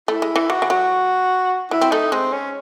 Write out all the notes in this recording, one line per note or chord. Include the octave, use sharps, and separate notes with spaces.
A3 E4
G#3
E3
E3 F#4
E3
F#3 F#4
F#3 E4
C4
A3 D#4
G#3 C4
C#4